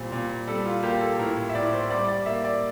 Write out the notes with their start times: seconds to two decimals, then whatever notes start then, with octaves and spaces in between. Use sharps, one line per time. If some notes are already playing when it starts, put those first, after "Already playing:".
Already playing: A#2 G3 C4
0.12 A#2
0.47 G3 A4
0.65 F4
0.83 A#3 G4
1.01 A4
1.19 A2 A#4
1.49 E5
1.55 A2 D5
1.73 C5
1.90 G3 D5
2.08 D5
2.26 A#3 E5
2.44 D5